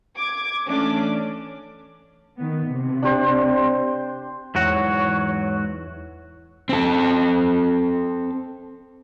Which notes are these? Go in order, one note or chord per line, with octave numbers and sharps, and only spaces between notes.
D6 G#6
E3 A3 C#4 D4 D6
D#3 B3
C3
D4 G4 C5
E2 G#2 F#3 E4 F#4 C#5 F#5
C4 A4